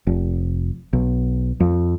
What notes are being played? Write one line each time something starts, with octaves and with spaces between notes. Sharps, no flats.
F1
B1
F2